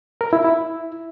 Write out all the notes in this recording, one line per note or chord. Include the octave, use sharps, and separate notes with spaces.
A#4
E4
E4